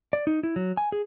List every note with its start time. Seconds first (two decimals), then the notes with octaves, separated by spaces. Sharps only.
0.13 D5
0.27 D#4
0.43 E4
0.56 F#3
0.77 G#5
0.92 G#4